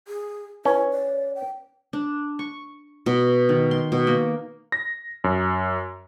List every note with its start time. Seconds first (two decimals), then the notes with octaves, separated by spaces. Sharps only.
0.08 G#4
0.65 C#4 E4 B4
0.92 D5
1.35 G5
1.93 D4
2.39 C#6
3.06 B2
3.49 D#3
3.71 C6
3.92 B2
4.07 A#3
4.72 A#6
5.24 F#2